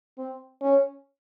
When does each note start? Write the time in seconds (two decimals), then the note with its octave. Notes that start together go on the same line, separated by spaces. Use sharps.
0.18 C4
0.62 C#4